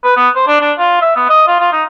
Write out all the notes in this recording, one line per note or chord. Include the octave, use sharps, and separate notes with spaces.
B4
B3
C5
D4
D4
F4
E5
B3
D#5
F4
F4
D#4